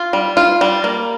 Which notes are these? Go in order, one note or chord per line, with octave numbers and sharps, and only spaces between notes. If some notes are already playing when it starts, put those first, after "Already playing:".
Already playing: F4
G3
F4
G3
A#3